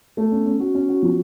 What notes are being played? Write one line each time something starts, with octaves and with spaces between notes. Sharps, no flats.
A3
C#4
C#4
F#4
C#4
F#4
F3